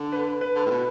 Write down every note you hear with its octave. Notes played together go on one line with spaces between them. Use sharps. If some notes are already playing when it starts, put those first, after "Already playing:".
Already playing: D3
B4
B4
D3
A2
B2